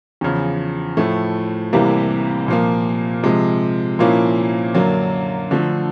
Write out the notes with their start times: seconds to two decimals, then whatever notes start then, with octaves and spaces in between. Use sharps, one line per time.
0.21 E2 C#3 F3
0.97 A2 F3 A3
1.73 C2 C3 E3 G3 A#3
2.48 A#2 F3 A#3
3.23 C3 F3 G#3
3.99 A#2 F3 A#3 C#4 E4
4.75 F#2 D3 F#3 A#3
5.51 D3 F3 A3